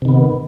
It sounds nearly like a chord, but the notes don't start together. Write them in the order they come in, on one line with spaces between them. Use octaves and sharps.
C3 D#3 B3